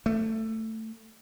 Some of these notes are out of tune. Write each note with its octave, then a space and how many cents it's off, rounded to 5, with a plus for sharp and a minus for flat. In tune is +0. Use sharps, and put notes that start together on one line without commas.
A3 +15